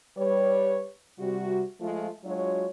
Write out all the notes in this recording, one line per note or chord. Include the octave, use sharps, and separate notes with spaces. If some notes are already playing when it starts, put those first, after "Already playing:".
G3 B4 C#5
C3 G3 F#4
F3 G#3 A3 F4
F#3 G#3 D4 F4 F#4 C#5